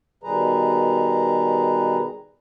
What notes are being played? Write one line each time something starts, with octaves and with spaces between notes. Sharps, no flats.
B2 D#3 G3 G#4 B4 A#5